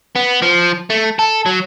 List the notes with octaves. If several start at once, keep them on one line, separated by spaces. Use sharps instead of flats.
B3
F3
A3
A4
F#3